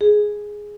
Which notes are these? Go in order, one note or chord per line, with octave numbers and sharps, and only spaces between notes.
G#4